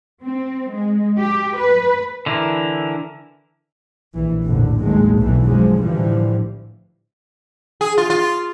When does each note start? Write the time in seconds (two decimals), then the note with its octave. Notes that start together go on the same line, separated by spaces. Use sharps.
0.23 C4
0.71 G#3
1.19 G4
1.59 B4
2.26 D3 E3 E4 A#4
4.14 A#1 E3
4.44 F1 A#1 D#2 A2 D3
4.80 A1 D#2 A2 F#3 G#3 A3
5.18 B1 B2 D3 E3
5.47 F#2 D3 F3 F#3 G#3
5.80 A2 D3 E3 F3 G3
7.81 G#4
7.98 F4
8.10 F4